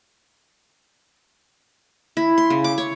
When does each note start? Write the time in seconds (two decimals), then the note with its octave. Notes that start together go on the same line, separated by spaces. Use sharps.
2.17 E4
2.38 C6
2.50 C#3
2.64 D6
2.78 C#5